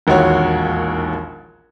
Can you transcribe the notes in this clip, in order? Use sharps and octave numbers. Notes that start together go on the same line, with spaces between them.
E1 A#1 D#2 F#4 C#5